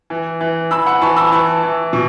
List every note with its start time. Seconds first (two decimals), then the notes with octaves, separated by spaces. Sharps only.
0.10 E3
0.41 E3
0.71 E3 B5 E6
0.86 F#5 B5
1.01 E3 A5 C#6
1.17 B5 E6
1.32 E3 A5 C#6
1.63 E3
1.93 B2